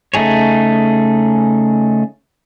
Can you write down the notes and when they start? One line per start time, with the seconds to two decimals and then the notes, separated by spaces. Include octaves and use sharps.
0.14 C#3 A3 D#4 G#4 C#5